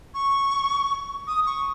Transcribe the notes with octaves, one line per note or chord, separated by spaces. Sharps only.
C#6
D#6
C#6